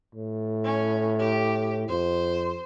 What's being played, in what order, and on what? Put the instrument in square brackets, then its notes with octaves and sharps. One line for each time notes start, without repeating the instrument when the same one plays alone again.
[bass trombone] A2
[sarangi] C#4
G4
[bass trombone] F2 [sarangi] C5